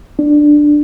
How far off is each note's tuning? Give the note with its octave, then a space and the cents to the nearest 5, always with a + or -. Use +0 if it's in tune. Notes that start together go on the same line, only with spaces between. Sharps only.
D4 +10